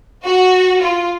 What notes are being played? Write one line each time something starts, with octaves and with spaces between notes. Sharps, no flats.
F#4
F4